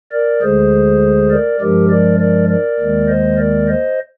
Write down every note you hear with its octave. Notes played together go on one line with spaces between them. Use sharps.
A#4 D5
D2 D3 G#3 G#4 C5
A#4 D5
G2 F3 G#3 G4 A#4
A#4 D5
A#4 D5
A#4 D5
D#2 D#3 G#3
C5 D#5
A#4 D5
C5 D#5